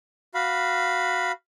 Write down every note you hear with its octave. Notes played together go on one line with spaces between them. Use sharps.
F#4 F5 B5